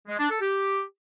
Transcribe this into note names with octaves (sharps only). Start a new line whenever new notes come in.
G#3
D4
A4
G4